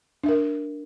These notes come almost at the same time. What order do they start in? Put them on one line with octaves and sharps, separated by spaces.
D4 E5 A#4